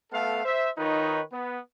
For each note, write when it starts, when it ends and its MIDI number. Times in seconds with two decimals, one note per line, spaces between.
0.12 0.42 57
0.12 0.42 59
0.12 0.42 69
0.12 0.42 77
0.45 0.69 72
0.45 0.69 76
0.78 1.21 51
0.78 1.21 63
0.78 1.21 65
0.78 1.21 71
0.78 1.21 73
1.31 1.58 59